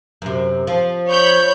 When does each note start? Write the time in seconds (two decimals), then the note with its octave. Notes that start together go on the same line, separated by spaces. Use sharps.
0.22 F#2 C3
0.67 F3
1.09 C#5 B5 G6